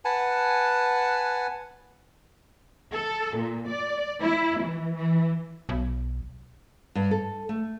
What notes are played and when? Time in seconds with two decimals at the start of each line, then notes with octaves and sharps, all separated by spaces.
0.05 B4 F#5 G#5 A5
2.92 A4
3.37 A#2
3.69 D5
4.21 E4
4.61 E3
4.96 E3
5.69 B1
6.95 G2
7.11 A4
7.49 A3